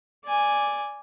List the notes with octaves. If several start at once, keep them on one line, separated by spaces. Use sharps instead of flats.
D5 G#5